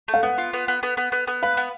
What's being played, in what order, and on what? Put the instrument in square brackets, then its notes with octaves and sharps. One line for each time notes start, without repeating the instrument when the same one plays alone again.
[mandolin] A3
[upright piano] F5
[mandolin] B3 [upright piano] F#5
[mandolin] F4
B3
B3
B3
B3
B3
B3
[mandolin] B4 [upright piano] F5
[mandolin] B3